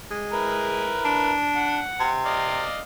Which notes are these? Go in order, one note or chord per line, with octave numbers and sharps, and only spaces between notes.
G#3
E4 A#4 B4
D4
F#5
C3
D5 D#5 F5